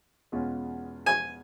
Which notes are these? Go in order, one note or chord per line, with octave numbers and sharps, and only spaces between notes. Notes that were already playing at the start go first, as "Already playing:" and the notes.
E2 B2 G#3 C#4 F4
G#5